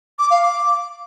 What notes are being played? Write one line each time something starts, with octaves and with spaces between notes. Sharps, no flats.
D6
F5
D6